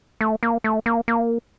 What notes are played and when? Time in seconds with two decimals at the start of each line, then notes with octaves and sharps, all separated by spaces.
0.21 A3
0.43 A#3
0.64 A3
0.86 A#3
1.08 A#3